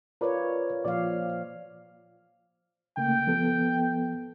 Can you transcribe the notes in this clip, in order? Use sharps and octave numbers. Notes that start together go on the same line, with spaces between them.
F4 A#4 B4 C#5 D5
A#2 F3 F4 D5 F5
C#3 A3 A#3 G5
F3 B3 A4